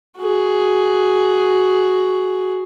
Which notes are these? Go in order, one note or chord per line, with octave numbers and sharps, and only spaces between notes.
F#4 G#4